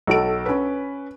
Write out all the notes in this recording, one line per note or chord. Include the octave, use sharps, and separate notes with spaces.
B1 F#4 A4 D7
C#4 B4